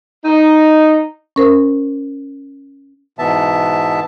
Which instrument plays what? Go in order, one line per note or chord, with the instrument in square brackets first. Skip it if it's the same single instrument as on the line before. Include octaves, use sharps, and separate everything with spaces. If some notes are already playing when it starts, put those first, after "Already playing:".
[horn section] D#4
[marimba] C#4 A#4 C5
[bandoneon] G#2 B2 E3 B3 E5 A5